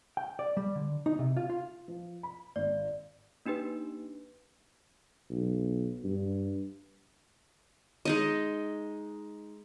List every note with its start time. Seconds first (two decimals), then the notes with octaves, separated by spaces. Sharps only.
0.17 G5
0.39 D5
0.57 G3
0.76 D3
1.06 D#4
1.19 C3
1.37 F4
1.50 F4
1.88 F3
2.23 B5
2.56 G#1 D5
3.46 A#3 D4 D#4 G4 B4
5.30 B1
6.04 G2
8.05 G#3 D#4 D#5